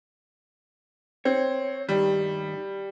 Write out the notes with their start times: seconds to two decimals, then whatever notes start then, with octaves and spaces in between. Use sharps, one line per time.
1.25 C4 C#5
1.89 G2 D#3 G3